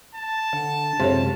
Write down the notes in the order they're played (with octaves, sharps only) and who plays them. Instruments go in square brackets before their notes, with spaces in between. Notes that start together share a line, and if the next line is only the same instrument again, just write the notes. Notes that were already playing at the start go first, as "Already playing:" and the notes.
[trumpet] A5
[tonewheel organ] D3 [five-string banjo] F#5
[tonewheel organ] F#2 G#3 [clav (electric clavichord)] C3 [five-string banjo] F4 A4 C#5